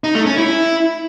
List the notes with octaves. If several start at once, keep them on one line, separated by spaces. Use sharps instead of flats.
D#4
A3
C#4
E4